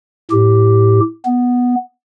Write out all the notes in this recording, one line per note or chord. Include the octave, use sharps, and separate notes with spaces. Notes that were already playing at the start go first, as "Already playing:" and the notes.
A2 G4
B3